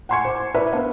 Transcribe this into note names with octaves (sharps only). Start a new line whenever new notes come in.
F#5 G#5 C6 C#6 G#6 C#7
C5 D6
A#4 B4 D5 E5
B3 D4 B4 C5 F5